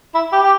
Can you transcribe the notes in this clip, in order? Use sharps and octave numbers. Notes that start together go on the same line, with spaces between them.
E4
G4
G4